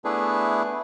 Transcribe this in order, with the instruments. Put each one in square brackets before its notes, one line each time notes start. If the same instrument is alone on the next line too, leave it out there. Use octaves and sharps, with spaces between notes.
[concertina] A3 B3 D4 E4 G#4 B4